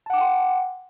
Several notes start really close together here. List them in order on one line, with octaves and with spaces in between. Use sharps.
A5 F#5 D6 G5 C6